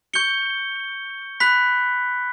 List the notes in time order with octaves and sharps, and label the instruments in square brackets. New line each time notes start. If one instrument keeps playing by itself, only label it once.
[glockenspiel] C#6 G6 C#7 G7
B5 F#6 B6